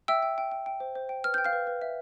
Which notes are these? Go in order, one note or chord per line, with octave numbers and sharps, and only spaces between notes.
E5 G5 E6
G5
G5
G5
G5
C5
C5
G5
B4 F6
G5 G6
F5 F6
B4
B4
E5